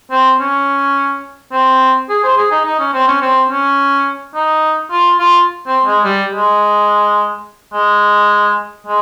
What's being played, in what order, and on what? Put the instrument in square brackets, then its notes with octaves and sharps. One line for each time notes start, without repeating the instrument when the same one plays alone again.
[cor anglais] C4
C#4
C4
G#4
C5
G#4
D#4
D#4
C#4
C4
C#4
C4
C#4
D#4
F4
F4
C4
G#3
G3
G#3
G#3
G#3